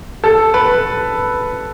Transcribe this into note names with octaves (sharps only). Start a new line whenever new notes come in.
A4
B4